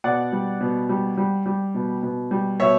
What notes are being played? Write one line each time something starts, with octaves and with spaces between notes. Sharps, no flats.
B2 D5 F#5
G3
B2
G3
G3
G3
B2
B2
G3
B2 C#5 E5